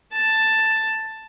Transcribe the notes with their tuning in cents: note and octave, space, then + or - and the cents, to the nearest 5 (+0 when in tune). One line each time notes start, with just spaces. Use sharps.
A5 +5